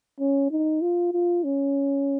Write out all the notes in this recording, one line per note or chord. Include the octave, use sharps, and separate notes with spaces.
C#4
D#4
F4
F4
C#4